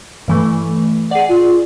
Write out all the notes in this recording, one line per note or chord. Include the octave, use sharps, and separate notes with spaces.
G2 E3 A3
G#4 D5 F#5
F4